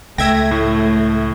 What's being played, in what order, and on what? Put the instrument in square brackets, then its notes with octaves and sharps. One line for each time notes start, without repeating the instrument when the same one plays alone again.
[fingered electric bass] C#2 [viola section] A3 [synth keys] E5 G#6 A#6 [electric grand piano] G5
[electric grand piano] A2